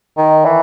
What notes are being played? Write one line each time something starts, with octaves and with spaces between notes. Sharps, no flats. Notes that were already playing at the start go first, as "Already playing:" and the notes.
D#3
E3